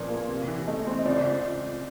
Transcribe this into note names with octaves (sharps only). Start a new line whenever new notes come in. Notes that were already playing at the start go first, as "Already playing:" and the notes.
Already playing: A#1 A#2 F3 A#4 B4 D5
A#3
C3
E3
A3 D#5
C4
D#5
C#2 D5